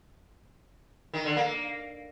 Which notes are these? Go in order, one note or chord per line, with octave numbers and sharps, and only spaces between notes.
D#3
D3
A#3